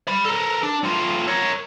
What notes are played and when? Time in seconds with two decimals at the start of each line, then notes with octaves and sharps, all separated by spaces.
0.07 D5 B5
0.25 A4 A#4
0.63 D4
0.83 A2 F4
1.27 A#4 C#5